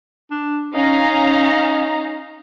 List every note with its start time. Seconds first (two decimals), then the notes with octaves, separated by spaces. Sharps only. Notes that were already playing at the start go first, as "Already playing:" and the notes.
0.31 D4
0.74 C#4 D#4 F5 A#5